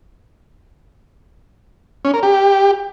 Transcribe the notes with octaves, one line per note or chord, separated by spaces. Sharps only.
C#4
A#4
G4